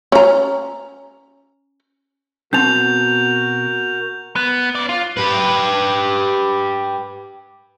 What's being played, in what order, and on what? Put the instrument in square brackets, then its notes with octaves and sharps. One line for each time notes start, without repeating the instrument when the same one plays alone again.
[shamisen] C#4 A#5
[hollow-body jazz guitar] B2 C4 A5 [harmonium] F#4 A#4 [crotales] G6 F7
[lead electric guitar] B3
C#4 D5
F4
[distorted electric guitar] G4 B4